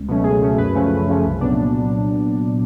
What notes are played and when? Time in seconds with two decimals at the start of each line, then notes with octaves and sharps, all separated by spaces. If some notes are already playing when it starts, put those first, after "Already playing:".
Already playing: C#2
0.08 B2 F#3 A3 C#4
0.24 C#2 G#4
0.41 B2 F#3 A3 C#4
0.58 F#2 B4
0.75 C#3 F3 A3 C#4
0.91 F#2
1.08 C#3 F3 A3 C#4
1.25 C2
1.41 A#2 F#3 B3 D4